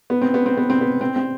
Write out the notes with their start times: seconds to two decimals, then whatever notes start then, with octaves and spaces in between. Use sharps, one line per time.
0.10 B3
0.21 C4
0.34 B3
0.46 C4
0.58 B3
0.70 C4
0.81 B3
1.01 C4
1.16 C4